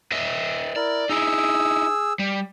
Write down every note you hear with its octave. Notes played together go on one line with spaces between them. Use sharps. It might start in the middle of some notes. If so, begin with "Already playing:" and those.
B4 D#5 E5
E4 A#4 D5
D#4 E4 G#4 E6
G3